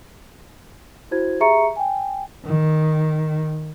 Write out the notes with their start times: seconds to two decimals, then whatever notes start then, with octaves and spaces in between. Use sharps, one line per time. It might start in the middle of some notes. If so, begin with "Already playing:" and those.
1.11 E4 F#4 C5 G#6
1.40 G4 G#4 E5 A#5 C#6 C#7
1.76 G5 G#5
2.46 D#3